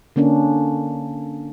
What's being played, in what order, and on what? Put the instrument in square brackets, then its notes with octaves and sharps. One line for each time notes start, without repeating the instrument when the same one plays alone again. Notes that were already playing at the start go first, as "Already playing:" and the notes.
[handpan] D3 A#3 C#4 D4